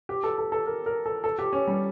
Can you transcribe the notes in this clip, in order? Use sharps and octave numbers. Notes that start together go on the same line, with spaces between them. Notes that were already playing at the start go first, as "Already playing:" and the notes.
G4
A4
A4
A4
A#4
A#4
A4
A4
G4
C#4
G3